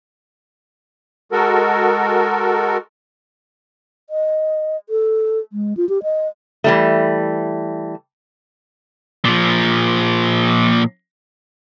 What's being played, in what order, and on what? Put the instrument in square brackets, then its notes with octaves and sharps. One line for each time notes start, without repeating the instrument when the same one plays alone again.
[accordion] G#3 F#4 A4 A#4
[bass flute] D#5
A4
G#3
F4
G4
D#5
[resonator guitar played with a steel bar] E3 G3 A3
[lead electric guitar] A#2 F3